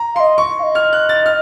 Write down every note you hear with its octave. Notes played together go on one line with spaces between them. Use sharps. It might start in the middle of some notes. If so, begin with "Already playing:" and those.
Already playing: A#5
D#5 F5 C6
C#6
F5
D#5
F6
F#6
A6
F6